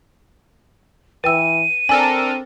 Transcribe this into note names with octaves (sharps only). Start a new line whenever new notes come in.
E3 B4 G5 E6 D#7
C4 D4 A4 A#4 G#5